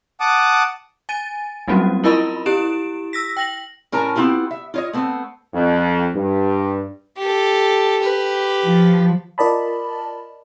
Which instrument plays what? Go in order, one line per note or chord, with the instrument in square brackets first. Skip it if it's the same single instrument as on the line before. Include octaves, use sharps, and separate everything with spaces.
[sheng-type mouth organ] F#5 A5 D6 D#6
[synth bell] G#5 A6 D#7
F#3 G3 A#3 C4 C#4 F#4
E4 F4 A#4 D#5 B5 C6
E4 G4 D7 E7
E6 A#6 B6
G5 A#6 F#7
[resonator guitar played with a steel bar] A2 C#4 A#4 A5 A#5
B3 C4 E4 F4 G4
E5
F4 C#5 D#5
A3 B3 C4
[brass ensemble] F2
G2
[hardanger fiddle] G4 A4
G4 B4
[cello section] F3
[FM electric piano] F4 A#4 D5 D#5 A5 B5